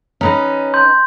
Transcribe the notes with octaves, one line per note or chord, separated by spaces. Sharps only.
C#4 D#4 B4 D#5
C6 G6